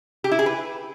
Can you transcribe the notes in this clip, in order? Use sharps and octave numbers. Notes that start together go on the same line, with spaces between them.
G4
E4
G#4
B4